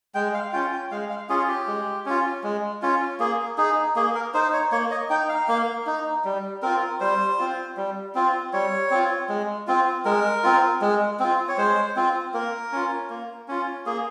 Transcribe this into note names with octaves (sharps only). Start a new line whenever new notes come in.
G#3 G5
F5
C#4 F4 G5
G5
G#3 F5
F5
C#4 F4 G#4
G4
G#3
C#4 F4
G#3
C#4 F4
A#3 G#4
D#4 G#4
A#3 G#4
A#4
D#4 C5
C#5
A#3 C#5
D#5
D#4 G5
F5
A#3
D#4
G3
C4 F4 A#4
G3 C5
C4 F4
G3
C4 F4
G3 C#5
C4 F4
G#3
C4 F4
G#3 A#4
C4 F4
G#3
C4 F4
C#5
G#3 C5
C4 F4
A#3 A#4
C#4 F4
A#3
C#4 F4
A#3 G#4